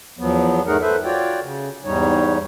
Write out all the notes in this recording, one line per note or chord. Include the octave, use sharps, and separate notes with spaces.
E2 F3 F#3 B3
G#2 A3 D#4 G#4 A#4 F#5
A4 B4 C5 E5
F4 F#4 C#5 D5 G5
C#3
E2 G#2 G3 D#4 C#5